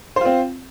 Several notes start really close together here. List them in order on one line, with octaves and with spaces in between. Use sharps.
C5 F4 C4